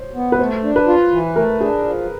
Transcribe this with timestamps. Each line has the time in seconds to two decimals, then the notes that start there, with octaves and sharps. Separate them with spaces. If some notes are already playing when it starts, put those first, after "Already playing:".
Already playing: C5 C#5
0.15 B3
0.32 B4
0.39 A3 C5
0.63 D4
0.76 B4
0.87 F4
1.12 E3
1.36 A3 A#4
1.60 D4 G#4
1.84 F3